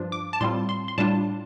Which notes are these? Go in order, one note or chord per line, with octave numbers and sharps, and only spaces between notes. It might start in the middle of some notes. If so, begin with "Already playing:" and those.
Already playing: G2 F3 D4 F4
D6
A5
A2 G3 C4 F4 C6
C6
C6
A2 G3 D4 F4 A5